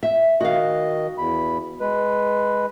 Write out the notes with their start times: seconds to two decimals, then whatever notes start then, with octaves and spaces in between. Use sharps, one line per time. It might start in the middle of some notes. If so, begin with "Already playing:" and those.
0.03 E5
0.41 D#3 F#4 D#5 F5
1.18 E2 B5
1.80 G#3 B4